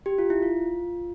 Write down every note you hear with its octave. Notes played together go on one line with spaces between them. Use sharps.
G4
F4
E4
F4